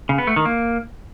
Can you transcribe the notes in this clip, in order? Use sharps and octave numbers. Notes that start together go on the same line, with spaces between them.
C#3
B3
A3
D#3
A#3